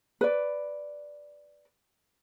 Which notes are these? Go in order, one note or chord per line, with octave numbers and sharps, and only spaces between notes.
B4 D5